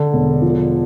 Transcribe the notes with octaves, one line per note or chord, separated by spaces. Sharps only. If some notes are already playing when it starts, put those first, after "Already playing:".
Already playing: D3
E1
F3